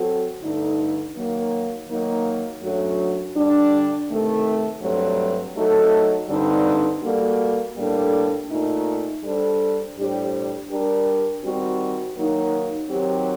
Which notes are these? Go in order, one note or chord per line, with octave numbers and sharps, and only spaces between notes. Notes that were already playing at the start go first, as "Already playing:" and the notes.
Already playing: F#3 C4 F#4 A4
G2 D3 A3 D#4
D#3 F#3 A#3
D#3 F#3 A#3 D#4
F#2 F#3 A3 D4 F#4
D3 G3 D4
C3 D#3 A3
G2 F#3 A3 C4 G4
F#3 A3 D#4 A4
G2 D3 G3 C4 D#4
G3 A#3 F#4 A4
A2 G3 A#3 D4 A4
A#2 A3 D#4
G3 D4 A4 C5
A2 G3 D4 G4 C5
G3 D4 G4 A#4
D#3 G3 C4 F#4
D#3 F#3 A#3 D#4
D#3 F#3 C4 G4